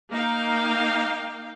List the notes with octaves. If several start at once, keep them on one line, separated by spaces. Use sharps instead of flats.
A#3 D#4 F5 G5